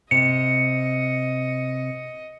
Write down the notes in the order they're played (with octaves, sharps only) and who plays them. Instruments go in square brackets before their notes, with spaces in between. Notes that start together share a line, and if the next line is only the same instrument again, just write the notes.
[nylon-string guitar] C3 [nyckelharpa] D#5 [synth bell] C#7